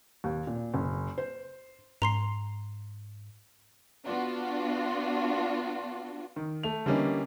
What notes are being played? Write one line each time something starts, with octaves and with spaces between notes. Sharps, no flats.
D#2
A#2
F#1
C5
G#2 A#5 C6 C7
B3 D4 F4 F#4
D#3
A3 F7
D3 E3 G3 A#3 C#4 D#4